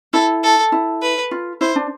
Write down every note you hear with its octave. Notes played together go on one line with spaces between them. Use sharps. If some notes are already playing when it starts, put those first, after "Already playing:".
E4 A4
A4
E4
B4
F4
E4 C5
D4